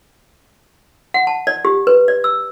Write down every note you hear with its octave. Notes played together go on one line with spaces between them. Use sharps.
F#5
A5
D5
G4
B4
D5
E6